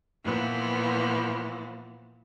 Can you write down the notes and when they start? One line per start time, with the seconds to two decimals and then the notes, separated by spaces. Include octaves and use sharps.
0.23 A#2 E3 F3 B3